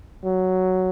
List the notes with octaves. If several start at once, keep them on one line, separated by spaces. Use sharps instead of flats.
F#3